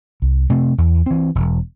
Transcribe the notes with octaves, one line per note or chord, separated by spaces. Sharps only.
C2
C3 A3 C4
E2
E3 C4
E1